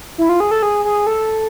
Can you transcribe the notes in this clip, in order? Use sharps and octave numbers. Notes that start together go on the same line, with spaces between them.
E4
F4
G#4
A4
G#4
G#4
A4